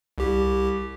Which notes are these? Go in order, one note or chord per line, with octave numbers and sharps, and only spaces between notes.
C2 G4